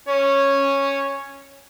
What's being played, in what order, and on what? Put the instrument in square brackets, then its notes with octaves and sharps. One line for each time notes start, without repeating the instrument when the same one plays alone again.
[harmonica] C#4 C#5